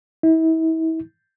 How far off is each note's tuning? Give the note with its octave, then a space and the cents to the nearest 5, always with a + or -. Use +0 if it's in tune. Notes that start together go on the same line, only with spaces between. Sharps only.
E4 -35